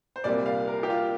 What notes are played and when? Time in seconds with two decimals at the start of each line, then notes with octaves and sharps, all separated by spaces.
0.16 C5
0.24 C2 A#2 G3 A#3 D5
0.46 F5
0.68 A#4
0.83 G4
0.90 F4